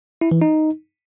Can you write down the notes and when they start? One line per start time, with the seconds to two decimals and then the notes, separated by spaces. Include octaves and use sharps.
0.21 E4
0.31 E3
0.42 D#4